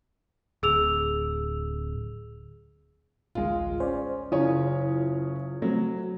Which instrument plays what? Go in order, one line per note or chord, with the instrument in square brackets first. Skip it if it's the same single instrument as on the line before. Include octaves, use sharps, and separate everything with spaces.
[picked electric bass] D1 [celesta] G#4 E6 F7
[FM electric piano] A1 D2 [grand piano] G#3 F4
[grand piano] C#4 [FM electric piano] C5 D5
[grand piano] F#1 C#4 C#5 [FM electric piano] E4 F4 D#6
[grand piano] F#3 [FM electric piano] A3 C4